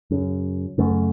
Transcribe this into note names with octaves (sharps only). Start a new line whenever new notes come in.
F#2 C#3
F#2 C#3 A3